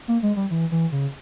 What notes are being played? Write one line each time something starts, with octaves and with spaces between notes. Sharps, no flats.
A#3
G#3
G3
E3
E3
C#3